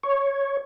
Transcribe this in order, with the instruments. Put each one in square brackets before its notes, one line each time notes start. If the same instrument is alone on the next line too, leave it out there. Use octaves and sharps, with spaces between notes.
[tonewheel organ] C#5